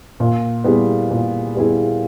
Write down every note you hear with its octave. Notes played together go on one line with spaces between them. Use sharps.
A#2
G3 B3 E4 G#4
A#2
G3 B3 E4 G#4